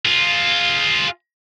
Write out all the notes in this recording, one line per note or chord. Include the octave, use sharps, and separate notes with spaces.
F4 G#4